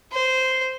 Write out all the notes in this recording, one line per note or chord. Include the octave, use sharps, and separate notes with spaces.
C5